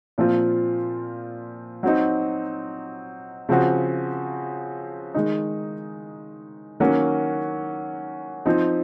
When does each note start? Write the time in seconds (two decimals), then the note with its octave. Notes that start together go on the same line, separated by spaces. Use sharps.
0.18 A#2 F3 C4 F4
1.83 F#3 C4 D#4
3.49 C#3 F3 C4 F#4
5.14 D#3 G#3 D#4
6.80 D#3 F#3 A#3 C#4 F#4
8.46 F3 C4 D#4